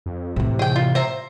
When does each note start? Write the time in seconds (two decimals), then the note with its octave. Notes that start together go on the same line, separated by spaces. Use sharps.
0.06 F2
0.36 A2 C3 E3
0.59 G#4 G5
0.76 F4
0.95 C5 E5 A#5